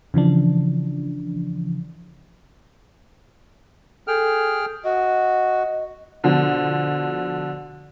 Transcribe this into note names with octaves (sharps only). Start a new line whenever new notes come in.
C#3 E3 F3 D4
G#4 A4 G5 F6
F#4 D#5
B2 D3 F3